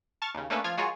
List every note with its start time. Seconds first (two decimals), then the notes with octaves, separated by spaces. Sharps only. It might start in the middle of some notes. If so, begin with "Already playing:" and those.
0.22 A5 C#6 F6 A6
0.35 D#2 C#3
0.50 A3 A#3 C#4 D4 A4 B4
0.64 F3 F4 F6 G#6
0.77 G#3 F4 F#4 G#4 A#4 C#5